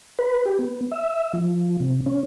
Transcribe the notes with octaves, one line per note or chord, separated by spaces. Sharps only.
B4
G4
B3
E5
F3
C3
C#4